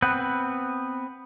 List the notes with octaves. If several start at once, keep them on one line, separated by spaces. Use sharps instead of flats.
B3 C4 B4